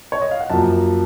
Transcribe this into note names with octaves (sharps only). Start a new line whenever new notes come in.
C#5
D#5
F5
F#5
F#2 F3 A#3 A5